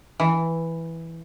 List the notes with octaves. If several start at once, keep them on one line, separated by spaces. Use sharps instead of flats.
E3